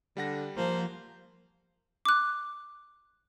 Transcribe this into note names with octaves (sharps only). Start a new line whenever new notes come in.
D3 G3 F#5 A#6
F3 A#3 C5
D6 F#6